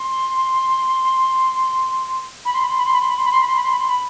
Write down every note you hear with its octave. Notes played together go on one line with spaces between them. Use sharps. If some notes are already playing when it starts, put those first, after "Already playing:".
Already playing: C6
B5
C6
B5
C6
B5
C6
B5
C6
B5
C6
B5
C6
B5
C6
B5
C6
B5
C6
B5